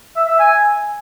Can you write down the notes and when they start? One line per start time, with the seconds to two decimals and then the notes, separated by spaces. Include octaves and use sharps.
0.16 E5
0.28 E5
0.40 G#5